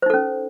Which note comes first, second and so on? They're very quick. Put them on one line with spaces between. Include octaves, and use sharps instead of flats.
C5 D#4 A4 C#4